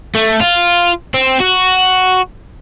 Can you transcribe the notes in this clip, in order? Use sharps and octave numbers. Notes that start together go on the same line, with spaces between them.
A3
F4
C4
F#4